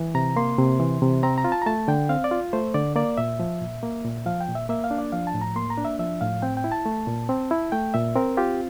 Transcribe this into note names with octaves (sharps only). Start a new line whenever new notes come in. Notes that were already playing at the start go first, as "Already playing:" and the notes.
Already playing: E3
C3 A#5
A#3 C6
C3
E3
C3
C4 A#5
A#5
F4
A5
A#5
A3 A5
D3 G5
C4 F5
D5
F4
A3 C5
D3 D5
A#3 D5
A#2 E5
F3
A#2
A#3
A#2
F3 F5
G5
A#2
E5
A#3 E5
F5
D4
D5
F3 F5
A5
A2
A#5
A#3 C6
A#5
D4
E5
F3 E5
A2 F5
C4 G5
G5
E4
A5
A3
A#2
C4
E4
A3 G5
A#2 E5
C4 A#4
F4 G4